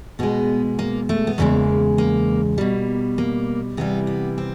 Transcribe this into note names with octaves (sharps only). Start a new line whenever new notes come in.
B2 G#3 B3
A#3
A3
B3
E2 C#3 F3 G#3 A#3
A#3
B2 G3 A#3
A#3
C3 E3 G3 B3
B3
C4